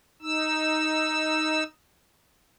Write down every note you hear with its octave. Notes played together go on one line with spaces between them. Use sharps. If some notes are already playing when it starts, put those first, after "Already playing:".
D#4 E6